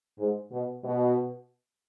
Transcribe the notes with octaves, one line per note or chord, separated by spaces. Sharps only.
G#2
B2
B2